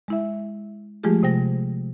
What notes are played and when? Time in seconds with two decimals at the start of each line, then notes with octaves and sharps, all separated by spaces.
0.08 G#3 E4 E5
1.03 F3 G#3 A3 F4 G4 G#4
1.23 C3 C5 G5 A#6